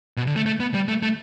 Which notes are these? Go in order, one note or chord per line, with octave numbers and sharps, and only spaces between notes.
B2
D3
A3
A3
B3
G3
A3
A3